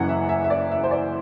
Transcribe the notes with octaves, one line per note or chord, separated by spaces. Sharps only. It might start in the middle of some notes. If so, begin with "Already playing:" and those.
Already playing: F#1 F#2 E3 F#5
E5
E5
E5
D5
E5
C5
D5